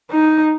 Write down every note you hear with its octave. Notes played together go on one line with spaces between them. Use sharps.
D#4